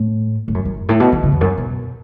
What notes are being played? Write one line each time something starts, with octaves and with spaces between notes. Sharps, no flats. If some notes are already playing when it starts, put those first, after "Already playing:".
Already playing: A2
A2
F#2
F#2
F#2
A2
B2
E3
C#3
E2
F#2
B2